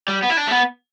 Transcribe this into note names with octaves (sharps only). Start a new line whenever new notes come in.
G3
B3
E4
D4
A3
B3